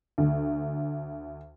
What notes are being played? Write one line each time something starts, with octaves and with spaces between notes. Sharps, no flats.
D2